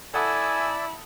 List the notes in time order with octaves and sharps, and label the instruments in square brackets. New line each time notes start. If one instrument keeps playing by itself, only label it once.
[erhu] E4 [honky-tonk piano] A4 F#5 D#6 [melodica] D5 E6 [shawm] G#5